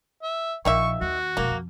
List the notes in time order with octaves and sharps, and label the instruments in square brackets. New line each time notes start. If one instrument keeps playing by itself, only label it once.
[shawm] E5
[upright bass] A#1 [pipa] D#3 A#3 E5 [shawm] C#6
[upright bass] D#2 [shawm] F#4
[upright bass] E1 F2 [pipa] A#3
[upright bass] F2